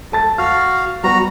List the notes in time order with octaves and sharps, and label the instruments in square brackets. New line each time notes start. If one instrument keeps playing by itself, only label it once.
[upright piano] A4 A5 A6
[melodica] F#4 F5 [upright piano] F6
[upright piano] G3 B3 [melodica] F#4 A#5